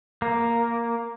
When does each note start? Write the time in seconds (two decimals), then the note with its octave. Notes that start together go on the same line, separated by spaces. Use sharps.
0.22 A#3